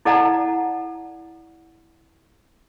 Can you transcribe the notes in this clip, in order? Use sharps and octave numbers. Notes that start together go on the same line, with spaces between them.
E4 A4 D5 F#5 A5 A#5